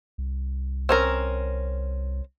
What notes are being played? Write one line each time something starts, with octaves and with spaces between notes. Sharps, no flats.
C2
C4 C#4 A#4